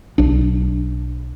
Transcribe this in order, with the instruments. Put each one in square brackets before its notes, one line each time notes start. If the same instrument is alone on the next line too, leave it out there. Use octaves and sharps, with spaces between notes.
[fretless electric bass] B1 D4